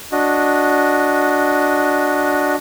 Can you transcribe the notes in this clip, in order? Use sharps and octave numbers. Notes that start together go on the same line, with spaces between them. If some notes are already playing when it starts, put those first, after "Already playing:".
D4 F#4 D#5